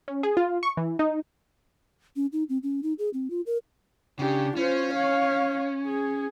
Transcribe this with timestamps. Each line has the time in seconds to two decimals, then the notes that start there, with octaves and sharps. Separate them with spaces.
0.08 C#4
0.23 G#4
0.37 F4
0.63 C#6
0.77 E3
0.99 D#4
2.16 C#4
2.33 D#4
2.49 C4
2.63 C#4
2.83 D#4
2.99 G#4
3.14 C4
3.30 F4
3.46 A#4
4.19 C#3 D4 G4
4.56 C#4 F4 C5
4.94 C#5 F5
5.87 G#4